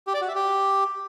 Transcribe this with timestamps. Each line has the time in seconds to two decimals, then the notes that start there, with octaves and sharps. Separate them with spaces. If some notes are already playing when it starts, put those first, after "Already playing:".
0.07 G4
0.14 D5
0.21 F#4
0.28 E5
0.35 G4